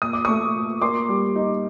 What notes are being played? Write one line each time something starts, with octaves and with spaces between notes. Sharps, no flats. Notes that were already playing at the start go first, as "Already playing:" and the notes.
A#2 D#6
D6
A3 C#6 D#6
A#2
A#3 C6 D6
G3
D#4